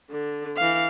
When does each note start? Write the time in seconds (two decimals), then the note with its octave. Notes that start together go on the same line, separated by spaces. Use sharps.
0.10 D3
0.57 E3 F5